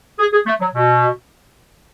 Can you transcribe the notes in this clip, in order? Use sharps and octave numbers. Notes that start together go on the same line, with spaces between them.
G#4
G#4
A3
F#3
B2